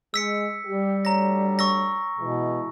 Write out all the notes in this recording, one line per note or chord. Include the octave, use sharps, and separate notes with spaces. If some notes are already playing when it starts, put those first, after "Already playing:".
G#3 E6 B6 C#7
G3 G4
D2 D4 C#5 A#5 A#6
C#6 E6 A#6
B2 E3 G#3